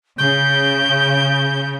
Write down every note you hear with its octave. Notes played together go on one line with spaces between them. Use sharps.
C#3 G6